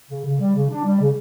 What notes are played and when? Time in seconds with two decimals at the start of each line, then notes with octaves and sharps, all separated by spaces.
0.10 C#3
0.25 C#3
0.40 G3
0.55 C#3
0.70 D4
0.85 G3
1.00 C#3